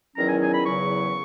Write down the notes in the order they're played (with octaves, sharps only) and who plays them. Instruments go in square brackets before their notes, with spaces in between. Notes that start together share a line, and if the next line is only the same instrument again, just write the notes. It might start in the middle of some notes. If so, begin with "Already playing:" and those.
[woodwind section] E2 D#3 F#3 C#4 E4 A#5
G#5
G#5
B5
E2 C#3 F#3 C#6